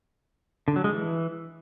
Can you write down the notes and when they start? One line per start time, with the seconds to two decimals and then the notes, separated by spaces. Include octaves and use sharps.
0.68 D3
0.76 F#3
0.84 G#3
0.93 E3